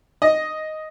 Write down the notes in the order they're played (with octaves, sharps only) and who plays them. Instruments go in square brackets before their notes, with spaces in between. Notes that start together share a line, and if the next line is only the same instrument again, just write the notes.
[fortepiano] D#5